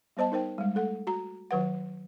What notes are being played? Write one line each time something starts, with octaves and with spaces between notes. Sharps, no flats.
G3 B3 C5 D#5 A5
D#4 A#4 C5 G5
G3 G#3
A3 A4 F#5
F#4 A#5
D#3 F#3 B4 F#5